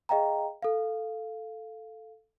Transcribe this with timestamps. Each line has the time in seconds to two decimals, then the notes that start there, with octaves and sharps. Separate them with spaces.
0.09 G#4 D#5 F5 G5 A#5
0.63 A4 F5